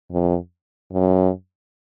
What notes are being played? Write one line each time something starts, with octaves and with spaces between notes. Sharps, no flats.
F2
F#2